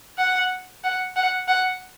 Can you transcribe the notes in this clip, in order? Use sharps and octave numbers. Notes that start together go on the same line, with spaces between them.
F#5
F#5
F#5
F#5